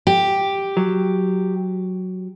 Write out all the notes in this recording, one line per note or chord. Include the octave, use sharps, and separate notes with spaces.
G4
F#3